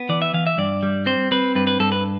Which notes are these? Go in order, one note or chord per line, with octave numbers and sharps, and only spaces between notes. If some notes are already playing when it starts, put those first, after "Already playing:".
Already playing: B3
E3 D5
E5
E3 F5
E5
G2 D5
G3
C4 C5
C4 B4
G2 B4
B4
G2 A4
B4